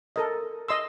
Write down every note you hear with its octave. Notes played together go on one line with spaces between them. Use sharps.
A4 A#4 D#5
D#5 C6 E6